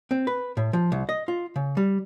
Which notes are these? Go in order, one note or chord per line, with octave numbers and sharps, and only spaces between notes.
C4
B4
A2
F3
C2
D#5
F4
C#3
G3